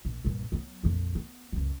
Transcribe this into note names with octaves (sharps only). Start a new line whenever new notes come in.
A#1
A#1 G2
F#3 B3
A#1 F2
B3
C#2 F#2